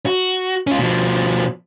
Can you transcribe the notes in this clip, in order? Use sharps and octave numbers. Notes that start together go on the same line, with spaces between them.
F#4
C#4 F4
B2 F3